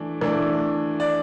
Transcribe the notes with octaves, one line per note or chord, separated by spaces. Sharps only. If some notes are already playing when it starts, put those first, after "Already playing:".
Already playing: E3 A3 D4
E3 A3 D4
D5